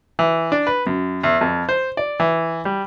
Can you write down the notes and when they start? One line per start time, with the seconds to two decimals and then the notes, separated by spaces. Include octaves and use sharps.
0.19 E3
0.52 D4
0.67 B4
0.87 F#2
1.23 E2
1.41 F2
1.69 C5
1.97 D5
2.20 E3
2.65 G3